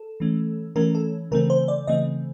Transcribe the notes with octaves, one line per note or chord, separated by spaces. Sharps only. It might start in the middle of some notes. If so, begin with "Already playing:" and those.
Already playing: A4
E3 A3 C#4
E3 A3 C#4 A#4
A4
C#3 E3 A3 C4 A#4
C5
D5
C#3 E3 A3 C4 D#5